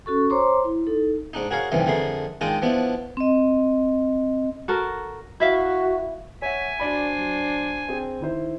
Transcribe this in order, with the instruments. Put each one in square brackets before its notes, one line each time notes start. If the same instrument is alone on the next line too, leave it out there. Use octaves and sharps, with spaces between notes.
[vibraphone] C#4 F#4 A4 C#6
C5 C#5 A#5 C6 D6
E4
D#4 A4
[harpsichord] G#2 D4 D#4
F#4 G#4 A#4 C#5 F5
D2 G2 C3 D#3 E3
F2 D3 A3 G#4 A#4 C6
D#3 G#3 D4 F4 G5 D#6
F3 B3 D4 E4
[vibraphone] C4 D#5
[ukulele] F#4 A4 A#4
[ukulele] E4 E5 F5 [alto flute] F#4
[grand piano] C#5 F#5 [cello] E5 [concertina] G#5
[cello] D4 C5 [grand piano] F#4 D5 B5
[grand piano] F#3
C4 G#4 G5
D#3 E4 C5